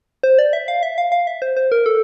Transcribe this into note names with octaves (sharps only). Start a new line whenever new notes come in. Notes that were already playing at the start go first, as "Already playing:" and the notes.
C5
D5
E5
F5
E5
F5
F5
E5
C5
C5
A#4
A4